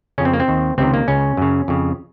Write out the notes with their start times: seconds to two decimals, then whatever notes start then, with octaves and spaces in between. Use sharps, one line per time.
0.18 F2 C#3 C#4
0.25 C4
0.33 A#3
0.40 C4
0.48 D#2 D#3
0.78 C#2 C3 D#3 C4
0.94 A#3
1.08 C#2 C#3 C#4
1.37 F#2 C#3
1.68 F2 C#3